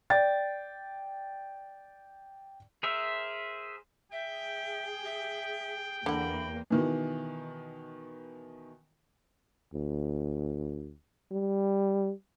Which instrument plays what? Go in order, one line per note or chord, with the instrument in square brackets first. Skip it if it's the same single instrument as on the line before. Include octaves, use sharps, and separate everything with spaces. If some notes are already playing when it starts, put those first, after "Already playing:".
[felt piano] D5 G5 A6
[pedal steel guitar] G#4 A#4 C5 E5
[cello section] G#4 [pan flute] E5 [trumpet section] G5
[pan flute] E5
[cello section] E2 A#3 [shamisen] D3 F#5 [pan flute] B5
[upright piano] B2 D#3 E3
[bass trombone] D2
G3